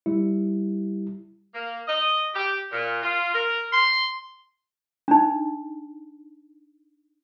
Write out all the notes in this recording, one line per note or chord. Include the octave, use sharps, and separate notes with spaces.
G3 E4
A#3
D#5
G4
A#2
F4
A#4
C6
D4 D#4